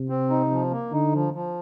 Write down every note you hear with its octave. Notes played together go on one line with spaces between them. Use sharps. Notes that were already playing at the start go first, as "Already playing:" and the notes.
Already playing: C3
C4
D#4
F3
A#3
D3 D#4
F3
F3